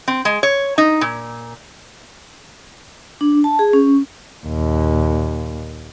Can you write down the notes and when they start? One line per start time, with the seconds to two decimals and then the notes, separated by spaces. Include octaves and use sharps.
0.08 C4
0.25 G#3
0.43 C#5
0.78 D#4
1.01 A#2
3.21 D4
3.44 A5
3.59 G#4
3.73 C#4
4.45 D#2 A#2